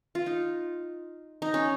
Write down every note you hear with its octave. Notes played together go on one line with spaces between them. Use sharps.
F4
D#4
D#4
C#4